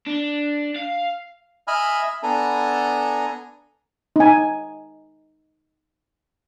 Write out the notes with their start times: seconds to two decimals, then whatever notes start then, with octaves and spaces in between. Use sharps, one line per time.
0.07 D4
0.76 F5
1.68 D#5 E5 G#5 B5 F6
2.03 E5
2.23 B3 D4 A4 G#5 A#5
4.16 D#4 G#5